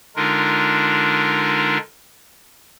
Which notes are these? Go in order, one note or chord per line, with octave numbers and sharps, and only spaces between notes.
D3 G#3 D4 D#4 F4 A#4